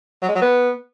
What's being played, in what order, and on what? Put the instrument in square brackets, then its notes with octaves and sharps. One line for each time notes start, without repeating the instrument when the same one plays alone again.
[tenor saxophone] F#3
G#3
F#3
B3